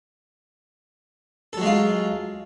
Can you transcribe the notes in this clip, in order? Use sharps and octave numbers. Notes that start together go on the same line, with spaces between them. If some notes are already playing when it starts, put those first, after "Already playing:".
F#3 G#3 F4 A4